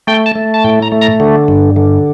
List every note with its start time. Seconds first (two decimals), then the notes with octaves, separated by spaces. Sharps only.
0.07 A3 G5
0.26 A5
0.36 A3
0.54 A5
0.64 A2 G5
0.82 A#5
0.92 A3
1.01 A#5
1.20 D3
1.48 G2
1.76 D3